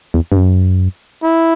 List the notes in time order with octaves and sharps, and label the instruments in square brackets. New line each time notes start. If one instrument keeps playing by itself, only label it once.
[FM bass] E2
G2
F#2
[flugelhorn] E4